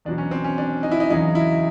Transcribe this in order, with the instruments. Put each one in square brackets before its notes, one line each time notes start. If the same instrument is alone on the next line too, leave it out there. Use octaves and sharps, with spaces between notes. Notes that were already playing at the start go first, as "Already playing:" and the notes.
[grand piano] E2 B2 F#3 D4
C#4
C4
C#4
D4
D#4
E4
D#4
E2 C#3 F#3 D#4
E4